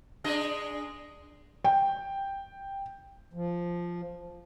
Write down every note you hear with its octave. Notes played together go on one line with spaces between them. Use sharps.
G#3 D4 D#5
G5
F3